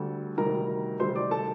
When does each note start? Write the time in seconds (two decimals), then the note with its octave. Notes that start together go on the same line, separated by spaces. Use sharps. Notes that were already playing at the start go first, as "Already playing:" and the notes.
Already playing: D2 D3 G3 A4
0.37 D2 C3 D#3 G3 A#4 A#5
1.00 D2 C3 D#3 G3 C5 C6
1.16 D5 D6
1.31 A4 A5